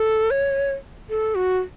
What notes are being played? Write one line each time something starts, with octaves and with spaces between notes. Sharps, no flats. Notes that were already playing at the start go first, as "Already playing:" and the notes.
Already playing: A4
C#5
A4
F#4